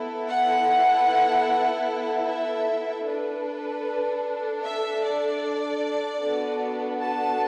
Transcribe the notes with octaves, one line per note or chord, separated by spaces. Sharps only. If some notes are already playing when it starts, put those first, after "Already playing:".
Already playing: B3 E4 A4
F#5
E5
D4 A4 B4
E5
D5
B3 D4 F#4 A4
A5